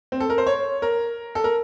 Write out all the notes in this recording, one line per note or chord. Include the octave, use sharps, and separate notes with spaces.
C4
A4
A#4
C5
C#5
A#4
A4
A#4